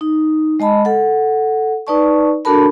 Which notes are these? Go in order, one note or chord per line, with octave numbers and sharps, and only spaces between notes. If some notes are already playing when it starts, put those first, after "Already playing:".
D#4
G#3 D#5 A5 B5
A4 F#5
D#4 B4 D5 A5 C#6
D4 F#4 A4 A#4 A5 B5